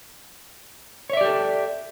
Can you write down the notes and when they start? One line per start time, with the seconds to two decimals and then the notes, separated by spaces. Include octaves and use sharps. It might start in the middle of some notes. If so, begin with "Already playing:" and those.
1.10 C#5
1.13 E5
1.17 D5
1.21 G4
1.25 A4